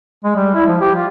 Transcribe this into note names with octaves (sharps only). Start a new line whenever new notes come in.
G#3
G3
E4
F3
G4
F4